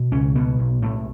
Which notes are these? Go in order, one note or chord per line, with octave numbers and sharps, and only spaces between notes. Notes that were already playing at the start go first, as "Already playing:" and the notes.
Already playing: B2
C#2 C#4
B2 B3
B1
A2 A3